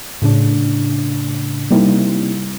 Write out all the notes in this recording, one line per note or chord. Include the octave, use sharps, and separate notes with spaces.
A2 C#3 D4
C3 G3 A#3 C4 D#4 E4